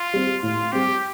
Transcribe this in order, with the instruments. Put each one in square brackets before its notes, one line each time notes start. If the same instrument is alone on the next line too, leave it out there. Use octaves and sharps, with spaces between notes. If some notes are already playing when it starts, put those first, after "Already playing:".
Already playing: [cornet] F4
[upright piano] G3 C4
[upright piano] A2 [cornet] F4
[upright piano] G3 C4 [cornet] G4